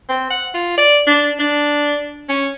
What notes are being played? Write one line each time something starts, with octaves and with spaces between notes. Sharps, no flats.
C4
F#5
F4
D5
D4
D4
C#4